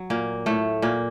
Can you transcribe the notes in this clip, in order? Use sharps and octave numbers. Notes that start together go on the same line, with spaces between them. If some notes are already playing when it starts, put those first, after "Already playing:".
Already playing: F#3
A#2 A#3
A2 A3
A#2 A#3